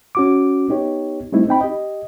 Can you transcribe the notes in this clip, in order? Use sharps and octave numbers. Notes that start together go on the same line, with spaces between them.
C#4 F#4 D6
B3 D#4 G4 C#5
G3 A3 C4 D#4 E4
C4 D#4 G5 B5
G4 D#5